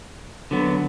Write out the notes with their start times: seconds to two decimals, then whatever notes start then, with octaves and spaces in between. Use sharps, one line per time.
0.51 D3 F#3 B3